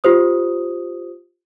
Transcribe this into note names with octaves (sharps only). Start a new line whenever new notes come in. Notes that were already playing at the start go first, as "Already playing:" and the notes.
F4 G4 C5 D#6